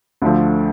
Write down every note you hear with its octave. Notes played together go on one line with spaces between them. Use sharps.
D2 D3 F3 A3